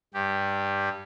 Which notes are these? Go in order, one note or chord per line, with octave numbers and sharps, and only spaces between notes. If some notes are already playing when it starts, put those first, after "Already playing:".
G2 G4